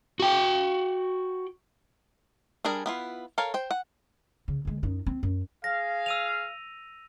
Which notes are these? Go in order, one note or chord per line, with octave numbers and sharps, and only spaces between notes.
F#4 G5
G3 D4 G#4 A#4
B3 E4 F4
A4 A#4 C#5 F5
C5 G5
F#5
C#3
D2 G#3
F#2 D#4
C4
F#2
G#4 F5 A#6
E6 D#7 F7